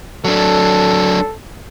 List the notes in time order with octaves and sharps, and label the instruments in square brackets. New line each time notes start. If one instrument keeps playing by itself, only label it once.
[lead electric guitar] F#3 D4 [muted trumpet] A4